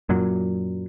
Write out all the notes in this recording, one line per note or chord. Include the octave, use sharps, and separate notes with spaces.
F#2 A#2 F#3